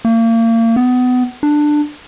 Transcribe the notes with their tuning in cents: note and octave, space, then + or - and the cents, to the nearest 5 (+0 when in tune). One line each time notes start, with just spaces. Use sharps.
A#3 -35
B3 +25
D4 +15